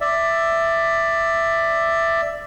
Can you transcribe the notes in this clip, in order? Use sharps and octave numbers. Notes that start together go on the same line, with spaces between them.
D5 E5